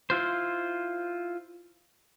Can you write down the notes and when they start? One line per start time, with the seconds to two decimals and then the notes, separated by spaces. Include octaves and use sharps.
0.10 E4 F4 C5